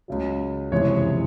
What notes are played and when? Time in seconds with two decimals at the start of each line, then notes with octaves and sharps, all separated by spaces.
0.08 C#2 C#3 F#3
0.72 F#1 F2 C3 E3 G#3 C#5